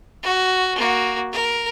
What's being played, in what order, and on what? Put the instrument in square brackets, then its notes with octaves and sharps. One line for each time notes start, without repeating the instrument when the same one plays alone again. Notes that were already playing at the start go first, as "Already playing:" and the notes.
[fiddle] F#4
A#3 F#4
A#4